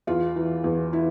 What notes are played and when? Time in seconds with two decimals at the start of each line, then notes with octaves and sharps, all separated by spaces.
0.07 E2 F4
0.36 E3
0.64 E2
0.93 E4